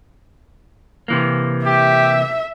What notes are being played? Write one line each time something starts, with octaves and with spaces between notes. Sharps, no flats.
C3 E3 A#3
G4 E5